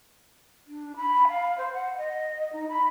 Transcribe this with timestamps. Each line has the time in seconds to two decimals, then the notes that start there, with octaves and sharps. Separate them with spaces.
0.67 D4
0.97 B5
1.28 F5
1.58 C5
1.74 F#5
1.97 D#5
2.52 D#4
2.69 B5